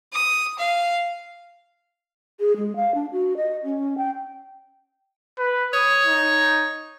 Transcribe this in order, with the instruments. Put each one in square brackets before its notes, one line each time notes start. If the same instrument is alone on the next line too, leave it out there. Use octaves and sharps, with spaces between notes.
[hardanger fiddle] D#6
F5
[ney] G#4
G#3
F5
D4
F#4
D#5
C#4
G5
[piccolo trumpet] B4
[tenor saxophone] C#5 [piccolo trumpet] D#6
[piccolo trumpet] D#4